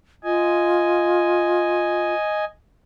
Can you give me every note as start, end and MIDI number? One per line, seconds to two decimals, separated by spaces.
0.24 2.14 65
0.24 2.45 75
0.24 2.45 80